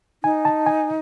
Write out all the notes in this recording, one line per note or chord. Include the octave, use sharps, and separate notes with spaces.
D#4 G#5
A5
G#5